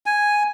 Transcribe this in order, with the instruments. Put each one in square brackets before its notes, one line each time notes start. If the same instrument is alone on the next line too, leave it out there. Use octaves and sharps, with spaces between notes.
[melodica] G#5